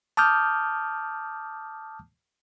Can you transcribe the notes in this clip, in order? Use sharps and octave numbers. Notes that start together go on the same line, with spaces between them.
A5 D6 D#6 F6 G6